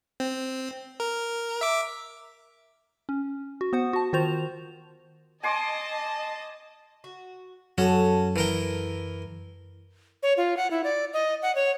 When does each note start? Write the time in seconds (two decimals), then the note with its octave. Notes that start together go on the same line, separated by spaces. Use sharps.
0.20 C4
1.00 A#4
1.61 E5 D6
3.09 C#4
3.61 F#4
3.73 B3 C5 F#5
3.93 F#4 A5
4.13 D#3 F4 F#4 C5 F7
5.43 D#5 G#5 A5 C6 D6
7.04 F#4
7.78 F#2 C#4 F#4 A4 A5
8.36 E3 A#4 G5
10.23 C#5
10.37 F4
10.57 F#5
10.71 E4
10.84 D5
11.13 D#5
11.42 F#5
11.55 C#5